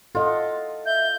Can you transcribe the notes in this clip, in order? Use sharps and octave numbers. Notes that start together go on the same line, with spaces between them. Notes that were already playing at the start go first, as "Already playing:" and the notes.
F4 A4 D#5 F#5
E5 G6